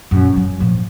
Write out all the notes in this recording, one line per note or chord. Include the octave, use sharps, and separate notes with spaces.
F#2 A#2
F#3
A#2 F3